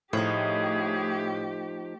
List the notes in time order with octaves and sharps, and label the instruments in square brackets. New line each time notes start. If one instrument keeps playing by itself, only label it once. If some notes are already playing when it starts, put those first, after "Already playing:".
[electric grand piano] A2 [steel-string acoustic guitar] F3 D#4 [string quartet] A3 G4 [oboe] G#4